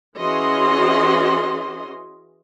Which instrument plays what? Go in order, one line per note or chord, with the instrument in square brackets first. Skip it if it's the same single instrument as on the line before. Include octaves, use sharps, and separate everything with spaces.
[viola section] E3 C#4 F#4 G#4 D#5 C6